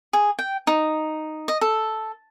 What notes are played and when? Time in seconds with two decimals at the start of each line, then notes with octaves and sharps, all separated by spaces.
0.13 G#4
0.39 G5
0.67 D#4
1.48 D#5
1.61 A4